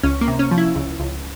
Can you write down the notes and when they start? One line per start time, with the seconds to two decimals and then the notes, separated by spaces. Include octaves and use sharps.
0.03 C#2 C#4
0.21 A#3
0.28 C3
0.39 C#4
0.51 F3
0.58 E4
0.75 C#2
1.00 C#2